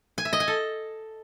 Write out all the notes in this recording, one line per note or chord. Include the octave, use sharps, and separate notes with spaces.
G#5
E5
D#5
G#5
A4